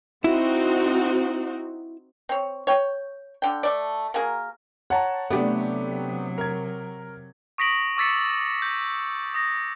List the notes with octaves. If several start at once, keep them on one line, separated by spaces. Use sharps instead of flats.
C4 D#4 E4 F#4
C4 C#5
C#5 G5
D3 G5
A3 D5
A#3 F#4 G#4 A#4
C#5 F#5 A5 A#5
C3 F#3 A3 B3 D4 G4
A#4 G#6
C#6 D#6 A#6 B6 D7 F#7
C#6 D6 E6 A6 B6 C#7
G6
D#6 A#6